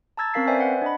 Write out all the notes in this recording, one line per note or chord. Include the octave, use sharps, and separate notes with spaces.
A5 A#5 E6 G#6 A6
C4 C#4 A#4 F5 B6 C7
B4 C5 D5 E5 G5 G#5
F#5
D4 D#5 B5